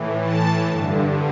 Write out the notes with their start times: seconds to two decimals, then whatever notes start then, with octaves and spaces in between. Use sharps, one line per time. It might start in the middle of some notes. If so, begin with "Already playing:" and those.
Already playing: A2 E3
0.22 A5
0.69 G2 D3